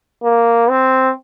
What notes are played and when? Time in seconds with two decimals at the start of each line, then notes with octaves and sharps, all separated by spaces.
0.24 A#3
0.70 C4